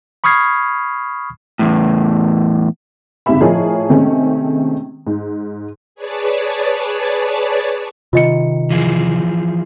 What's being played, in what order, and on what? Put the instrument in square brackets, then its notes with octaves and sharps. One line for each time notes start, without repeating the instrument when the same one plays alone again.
[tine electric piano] B5 C#6 D#6 F6 G#6 C7
[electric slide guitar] E2 A2
[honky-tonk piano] G1 G#2 C3 G4 E5 B5
A2 F3 G#4 A#4 C#5 D#5
C3 D#3 G#3 A3 C4 C#4
G#2
[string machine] G#4 B4 C#5 D5 A5
[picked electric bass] C3 D#3 [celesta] F4 D#5 C#7
[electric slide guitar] E3 F3 G#4